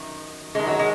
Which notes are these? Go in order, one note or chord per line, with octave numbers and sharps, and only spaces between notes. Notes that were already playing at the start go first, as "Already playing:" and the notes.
Already playing: F#2 D#3
F#2 D#3 G#3
F#3
G#3